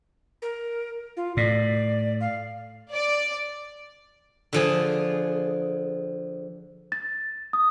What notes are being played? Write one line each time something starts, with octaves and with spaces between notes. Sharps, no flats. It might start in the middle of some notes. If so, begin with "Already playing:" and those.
A#4
F4
A2 D5
F5
D5
D3 F3 G#4
A6
D#6